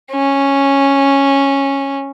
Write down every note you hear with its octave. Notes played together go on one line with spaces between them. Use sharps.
C#4